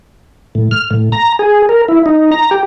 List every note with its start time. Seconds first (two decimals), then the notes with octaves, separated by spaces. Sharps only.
0.55 A2
0.71 F6
0.91 A2
1.12 A#5
1.39 G#4
1.69 A#4
1.88 E4
2.06 D#4
2.32 A#5
2.51 G4